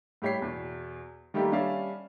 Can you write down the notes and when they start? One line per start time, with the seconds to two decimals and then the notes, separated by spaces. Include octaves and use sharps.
0.22 A2 G3 G4 C#5 B6 C7
0.42 E2 B2
1.34 D#3 G3 A3 A#3 G4
1.52 G3 C#4 D4 E5 F5